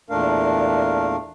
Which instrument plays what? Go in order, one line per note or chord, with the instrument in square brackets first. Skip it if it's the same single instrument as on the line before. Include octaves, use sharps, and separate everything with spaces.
[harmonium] E2 A#2 A3 D4 A#4 F5